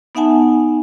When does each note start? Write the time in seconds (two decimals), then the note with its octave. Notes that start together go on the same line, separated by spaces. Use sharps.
0.15 B3 D#4 E5 F#5 G#5 A5